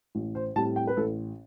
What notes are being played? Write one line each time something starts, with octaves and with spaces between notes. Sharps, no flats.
A1
C5
A2 G3 C4 A5
G5
B4
A1 A4